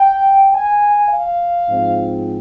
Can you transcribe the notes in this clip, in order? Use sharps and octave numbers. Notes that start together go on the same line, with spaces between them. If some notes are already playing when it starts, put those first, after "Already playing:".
Already playing: G5
G#5
F5
G#2 F3 C4